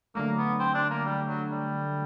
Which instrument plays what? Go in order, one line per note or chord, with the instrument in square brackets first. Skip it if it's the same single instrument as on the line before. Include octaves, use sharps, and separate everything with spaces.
[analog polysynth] D3 F#3 A3 [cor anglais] A#3
[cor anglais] B3
C4
D4
A#3
G3
F#3
G3